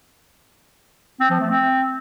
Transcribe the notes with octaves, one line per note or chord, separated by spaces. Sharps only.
C4
F3
A3
C4